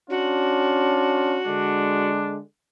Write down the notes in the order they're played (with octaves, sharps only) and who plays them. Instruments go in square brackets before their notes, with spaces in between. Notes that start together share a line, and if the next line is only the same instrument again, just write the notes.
[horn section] C#4 D4 F4 [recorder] F#4
[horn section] D3 G#3 D4